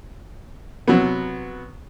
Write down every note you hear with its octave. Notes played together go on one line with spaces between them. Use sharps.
C3 F#3 B3